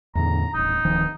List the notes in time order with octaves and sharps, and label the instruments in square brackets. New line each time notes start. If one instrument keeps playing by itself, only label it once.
[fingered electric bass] E2 A2 D3 [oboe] A#5
[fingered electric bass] D#1 A1 [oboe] D#4
[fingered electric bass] D1 D#3 F3